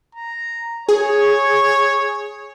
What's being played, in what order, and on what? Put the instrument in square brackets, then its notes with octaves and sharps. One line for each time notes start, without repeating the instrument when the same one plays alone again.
[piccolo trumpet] A#5
[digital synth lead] G#4 [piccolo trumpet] C#5